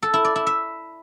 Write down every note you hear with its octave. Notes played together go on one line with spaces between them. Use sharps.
A4
E4
D5
E4
E5